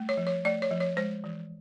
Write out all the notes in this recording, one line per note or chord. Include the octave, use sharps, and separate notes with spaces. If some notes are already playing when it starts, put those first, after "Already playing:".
Already playing: G3 A3
C#5
F3
C#5
A3 D5
C#5
F3
C#5
G#3 C5
E3